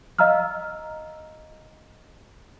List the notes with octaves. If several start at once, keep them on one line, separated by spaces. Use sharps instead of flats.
D#5 F5 A#5 E6 F6